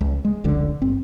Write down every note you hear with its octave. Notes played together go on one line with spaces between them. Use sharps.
C#2
G#3
F1 C#2 D3
G1 C4